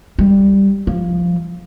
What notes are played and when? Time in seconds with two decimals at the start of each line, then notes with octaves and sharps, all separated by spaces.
0.19 G3
0.87 F3